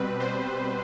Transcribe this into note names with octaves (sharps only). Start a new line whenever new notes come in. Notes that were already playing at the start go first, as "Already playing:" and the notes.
Already playing: B2 G3 C4 B4
B2 G3 C4 C5